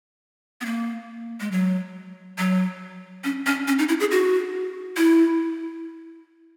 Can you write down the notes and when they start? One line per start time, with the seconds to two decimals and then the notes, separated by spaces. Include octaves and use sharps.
0.61 B3
0.65 A#3
1.40 G#3
1.52 F#3
2.38 F#3
3.24 C#4
3.46 C#4
3.68 C#4
3.79 D#4
3.89 E4
4.00 G#4
4.11 F#4
4.97 E4